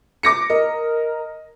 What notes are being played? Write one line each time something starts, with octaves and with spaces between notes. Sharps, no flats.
D6 A#6 C#7
A#4 D#5